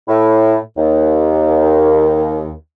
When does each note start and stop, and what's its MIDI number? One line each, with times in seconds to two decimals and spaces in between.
0.08 0.56 45
0.08 0.56 64
0.77 2.51 39